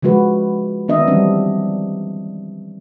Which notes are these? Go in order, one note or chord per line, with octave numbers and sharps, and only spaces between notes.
C#3 F3 G#3 F#4 B4
D#3 B3 D4 D#5 E5
E3 F3 G3 C4 D4